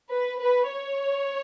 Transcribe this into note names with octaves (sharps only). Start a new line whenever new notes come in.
B4
B4
C#5